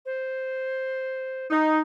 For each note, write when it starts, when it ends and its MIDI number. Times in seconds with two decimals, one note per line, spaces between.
0.05 1.46 72
1.50 1.79 63